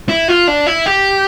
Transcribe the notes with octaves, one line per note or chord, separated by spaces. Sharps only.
E4
F4
D4
E4
G4